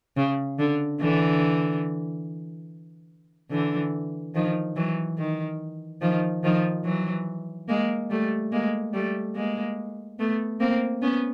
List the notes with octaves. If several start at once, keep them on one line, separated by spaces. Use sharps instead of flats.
C#3
D3
D3 E3
D3 E3
D#3 F3
E3 F#3
D#3
D#3 F3
D#3 F3
E3 F#3
G#3 A#3
G3 A3
G#3 A#3
G3 A3
G#3 A#3
A3 B3
A#3 C4
B3 C#4